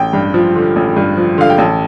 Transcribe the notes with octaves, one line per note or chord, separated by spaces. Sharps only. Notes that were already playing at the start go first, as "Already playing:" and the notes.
Already playing: A1 G5
G2
F3
D3
A1
G2
F3
D3 F5
G5
A1 A5